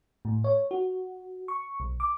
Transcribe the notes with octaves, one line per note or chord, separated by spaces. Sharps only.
A2
C#5
F#4
C#6
B1
D6